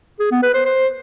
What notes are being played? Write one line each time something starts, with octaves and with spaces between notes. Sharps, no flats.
G#4
B3
B4
C5
C5